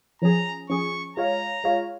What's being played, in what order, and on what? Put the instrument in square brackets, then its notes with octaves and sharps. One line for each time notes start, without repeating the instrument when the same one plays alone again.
[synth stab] F3 C#4 G#4 [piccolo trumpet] A#5
[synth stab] F3 C#4 G#4 [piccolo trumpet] C#6
[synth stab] G#3 F4 C#5 F5 [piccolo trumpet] A#5
[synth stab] G#3 F4 C#5 F5